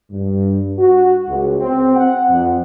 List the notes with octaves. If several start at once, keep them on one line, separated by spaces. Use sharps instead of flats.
G2
F#4
C#2
C4
F#5
F2